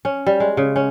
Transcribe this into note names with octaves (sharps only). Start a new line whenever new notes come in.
C#4
G3
G#3
C#3
C#4